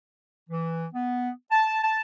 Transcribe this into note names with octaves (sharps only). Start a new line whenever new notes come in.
E3
B3
A5
A5